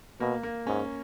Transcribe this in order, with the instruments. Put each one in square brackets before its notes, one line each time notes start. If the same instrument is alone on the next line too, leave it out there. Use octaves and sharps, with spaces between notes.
[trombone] B2 [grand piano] A#3
[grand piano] A#3
[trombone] G#2 [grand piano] C#4